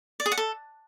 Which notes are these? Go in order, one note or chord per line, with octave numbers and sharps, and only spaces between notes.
D5
G#4
F#5
A4